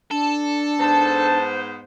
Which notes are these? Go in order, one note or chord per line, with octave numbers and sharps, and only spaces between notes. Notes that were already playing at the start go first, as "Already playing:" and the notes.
D4 A4
G#2 B3 C5 A5